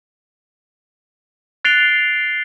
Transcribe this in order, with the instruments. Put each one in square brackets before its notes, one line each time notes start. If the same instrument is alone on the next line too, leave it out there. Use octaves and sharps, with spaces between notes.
[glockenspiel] F#6 A6 C7 D7 F7 G7